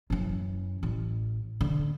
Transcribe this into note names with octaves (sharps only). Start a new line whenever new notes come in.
F#2 E3
A1
D3